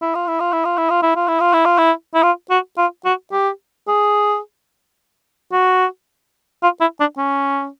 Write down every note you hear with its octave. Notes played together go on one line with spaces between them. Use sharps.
E4
F4
E4
F4
E4
F4
E4
F4
E4
F4
E4
F4
E4
F4
E4
E4
F4
F#4
F4
F#4
G4
G#4
F#4
F4
E4
D4
C#4